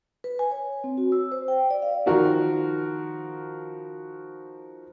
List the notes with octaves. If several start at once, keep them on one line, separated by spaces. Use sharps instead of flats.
B4
G#5
C#5
C4
F#4
E6
C5
G5
D5
F5
D#3 F3 F#4 A#4